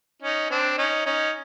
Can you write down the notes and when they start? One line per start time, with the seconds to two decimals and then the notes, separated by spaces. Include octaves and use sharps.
0.22 C#4 D#4
0.50 C4 D4
0.78 C#4 D#4
1.06 C#4 D#4